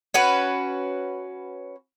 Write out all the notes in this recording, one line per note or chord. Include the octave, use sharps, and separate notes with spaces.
C#4 F#4 B4